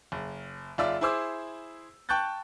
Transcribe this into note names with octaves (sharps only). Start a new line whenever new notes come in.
F#1
F#1 F4 D5 E5 E6
E4 G#4 C5 D6 E6
G5 A5 C#6 F#6 G6 A6